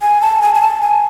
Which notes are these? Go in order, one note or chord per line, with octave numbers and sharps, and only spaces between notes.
G#5
A5
G#5
G#5
A5
G#5